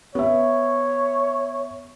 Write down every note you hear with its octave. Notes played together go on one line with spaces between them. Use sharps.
B3 C#5 E5